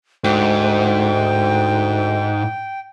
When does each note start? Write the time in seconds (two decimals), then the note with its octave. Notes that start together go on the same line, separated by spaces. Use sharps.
0.24 D2 G#2 G5